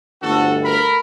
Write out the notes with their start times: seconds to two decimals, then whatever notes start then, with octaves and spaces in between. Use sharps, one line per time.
0.22 G1 D2 F#4 A4
0.64 A#4 B5